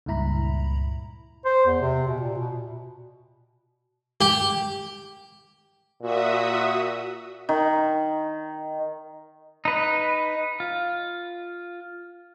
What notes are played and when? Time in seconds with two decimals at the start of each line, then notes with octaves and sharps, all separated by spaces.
0.06 C#2 G2 A#2 E4 A#5 B5
1.45 C5
1.66 E2
1.82 C3
2.08 B2
2.20 A#2
2.38 B2
4.21 G4
6.02 A#2 F#4 E5 D#6
7.49 D#3
9.65 D#4 B4
10.60 F4